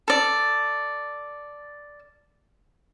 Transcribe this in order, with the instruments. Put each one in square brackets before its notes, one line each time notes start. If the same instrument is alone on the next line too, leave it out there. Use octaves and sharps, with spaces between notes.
[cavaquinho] A4 D5